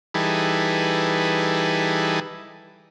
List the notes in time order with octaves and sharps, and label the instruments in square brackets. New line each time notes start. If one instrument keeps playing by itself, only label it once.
[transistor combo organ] E3 G3 D#4 G#4 A4 B4